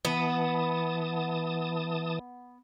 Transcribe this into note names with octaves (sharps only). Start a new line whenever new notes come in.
E3 B3 A5 D#6